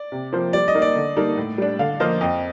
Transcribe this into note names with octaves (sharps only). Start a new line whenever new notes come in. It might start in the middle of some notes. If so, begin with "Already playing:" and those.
Already playing: D5
C3
F3 A#3 F4 C5
G3 D5
D#5
A#3 D#4
D5
D3
G3 A#3 D#4 A4
A2
G3 D4
D3 F5
F3 A#3 F4 C5 D#5
F2 D#5